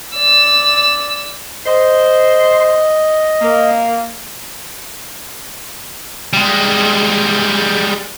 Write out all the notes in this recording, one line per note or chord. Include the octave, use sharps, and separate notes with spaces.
D5 E6
C5 D#5
A#3
G3 G#3